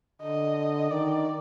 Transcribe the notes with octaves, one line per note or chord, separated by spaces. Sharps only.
D3 D#5
D#3 D5